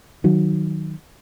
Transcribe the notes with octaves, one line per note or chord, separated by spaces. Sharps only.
D#3 F#3